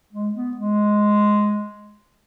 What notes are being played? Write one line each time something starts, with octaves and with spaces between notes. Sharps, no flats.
G#3
B3
G#3